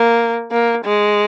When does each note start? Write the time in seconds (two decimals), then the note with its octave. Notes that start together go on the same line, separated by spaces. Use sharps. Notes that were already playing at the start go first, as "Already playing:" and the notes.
Already playing: A#3
0.52 A#3
0.85 G#3